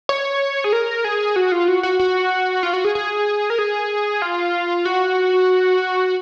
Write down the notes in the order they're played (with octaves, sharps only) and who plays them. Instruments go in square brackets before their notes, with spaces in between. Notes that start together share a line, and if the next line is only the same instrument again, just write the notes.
[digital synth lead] C#5
G#4
A#4
G#4
F#4
F4
F#4
F#4
F#4
F4
F#4
G#4
G#4
A#4
G#4
F4
F#4